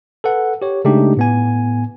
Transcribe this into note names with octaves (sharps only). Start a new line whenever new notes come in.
A4 B4 F#5
G4 C#5
C#3 G#3 A3 D4 D#4 G4
A2 B3 G#5